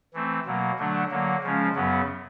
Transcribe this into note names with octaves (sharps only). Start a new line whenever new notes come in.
E3 A3 C4
B2 F#3 A#3
D3 F#3 A3 D4
D3 F#3 A#3
C#3 F3 G#3 C#4
F#2 C#3 F#3 B3